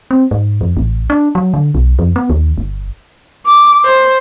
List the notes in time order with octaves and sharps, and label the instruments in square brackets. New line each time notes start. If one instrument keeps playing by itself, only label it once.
[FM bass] C4
G#2
F2
A1
D4
F#3
D3
B1
F2
B3
D#2
G1
[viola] D6
C5